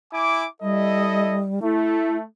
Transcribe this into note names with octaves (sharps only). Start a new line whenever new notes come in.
E4 G#5 D6
G3 E4 A4 D#5
A3 E4